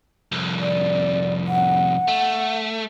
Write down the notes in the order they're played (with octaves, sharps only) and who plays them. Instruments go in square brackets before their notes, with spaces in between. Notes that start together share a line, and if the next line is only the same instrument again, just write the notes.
[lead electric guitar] C2 F2
[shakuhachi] D5
F#5
[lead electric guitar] A3